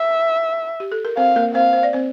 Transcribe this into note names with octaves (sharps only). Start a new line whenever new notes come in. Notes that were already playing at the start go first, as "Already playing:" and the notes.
Already playing: E5
G4
A4
A#4
C4 C5 F5
A#3 A#4
C4 C5 F5
C5
D5
C4 C5